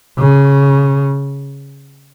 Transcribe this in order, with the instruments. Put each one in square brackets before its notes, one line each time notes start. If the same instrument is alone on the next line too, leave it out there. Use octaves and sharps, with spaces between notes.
[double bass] C#3